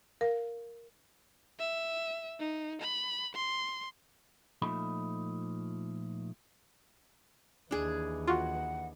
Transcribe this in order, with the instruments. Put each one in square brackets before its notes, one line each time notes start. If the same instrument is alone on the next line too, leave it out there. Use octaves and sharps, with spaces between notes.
[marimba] A#4 F5
[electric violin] E5
D#4
B5
C6
[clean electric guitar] A#2 F3 A3 D#4 B5
[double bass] D#2 E3 [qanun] D4 G#4
[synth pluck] F4 F#4 [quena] F#5